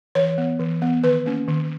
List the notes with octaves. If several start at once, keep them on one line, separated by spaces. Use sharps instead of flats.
E3 C#5
B3
E3
B3
D#3 B4
A#3 C#4
D#3